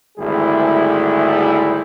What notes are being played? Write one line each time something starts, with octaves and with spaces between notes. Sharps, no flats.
G#1 D2 G3 E4 G#4